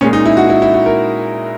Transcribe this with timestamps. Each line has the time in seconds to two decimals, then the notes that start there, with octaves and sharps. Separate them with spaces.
0.01 A#2 G#3 C#4
0.13 D#4
0.25 E4
0.37 F#4
0.50 E4
0.62 E4
0.74 F#4
0.86 A#4